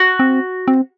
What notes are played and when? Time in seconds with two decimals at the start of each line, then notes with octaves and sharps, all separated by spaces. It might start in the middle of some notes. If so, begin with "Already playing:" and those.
Already playing: F#4
0.19 C4
0.68 C4